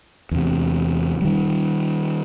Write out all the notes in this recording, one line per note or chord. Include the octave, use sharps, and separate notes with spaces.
E2 C3
D#3 G3